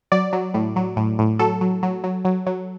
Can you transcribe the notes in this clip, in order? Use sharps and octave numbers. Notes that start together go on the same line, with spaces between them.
F#3 D5
F#3
A2
F#3
A2
A2
F#3 A4
F#3
F#3
F#3
F#3
F#3